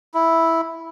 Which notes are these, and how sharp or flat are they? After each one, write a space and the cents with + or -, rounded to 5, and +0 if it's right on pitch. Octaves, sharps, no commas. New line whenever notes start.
E4 -5